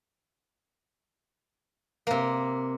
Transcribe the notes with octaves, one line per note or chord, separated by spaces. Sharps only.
C3 A#3